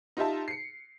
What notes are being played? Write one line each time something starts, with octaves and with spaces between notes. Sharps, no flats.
D#4 F4 G4 E5 A5
C7 C#7